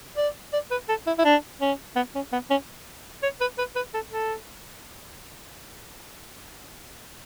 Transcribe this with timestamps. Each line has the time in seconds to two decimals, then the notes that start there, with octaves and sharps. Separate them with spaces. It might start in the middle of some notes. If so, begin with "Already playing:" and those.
0.17 D5
0.53 D5
0.71 B4
0.88 A4
1.07 E4
1.18 E4
1.24 D4
1.61 C#4
1.96 B3
2.15 C#4
2.32 B3
2.50 C#4
3.22 C#5
3.41 B4
3.58 B4
3.76 B4
3.94 A4
4.12 A4